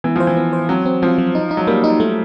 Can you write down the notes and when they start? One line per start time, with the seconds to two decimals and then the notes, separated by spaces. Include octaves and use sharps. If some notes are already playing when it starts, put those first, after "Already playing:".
0.04 E3 B3
0.16 F3 C5
0.27 E3
0.37 B3
0.53 C5
0.69 F#3 C4
0.86 C4
1.02 F3 C4
1.18 F#3
1.35 D#4
1.51 D#4
1.57 F#3
1.67 G3 A#3
1.84 D#4
2.00 A3